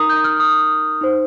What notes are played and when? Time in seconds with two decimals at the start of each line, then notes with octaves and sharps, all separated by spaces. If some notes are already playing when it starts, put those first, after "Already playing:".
Already playing: D#4 A#4 A#5 D#6
0.09 G6
0.24 F6
0.39 D#6
1.01 D#4 C5